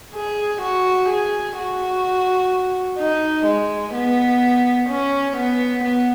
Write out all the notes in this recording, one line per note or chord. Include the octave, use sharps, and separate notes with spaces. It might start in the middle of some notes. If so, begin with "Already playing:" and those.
G#4
F#4
G#4
F#4
D#4
G#3
B3
C#4
B3
B3